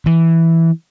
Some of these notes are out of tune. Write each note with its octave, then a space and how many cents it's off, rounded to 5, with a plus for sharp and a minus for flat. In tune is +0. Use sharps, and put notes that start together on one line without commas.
E3 +0